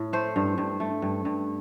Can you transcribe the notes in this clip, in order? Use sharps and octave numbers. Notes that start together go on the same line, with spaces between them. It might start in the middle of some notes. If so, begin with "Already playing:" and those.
Already playing: A2
A3 C5
G2
G2
A3
G2
G2